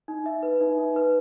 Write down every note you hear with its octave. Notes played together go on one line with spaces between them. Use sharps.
D#4
E5
B4
D#4
D#4
B4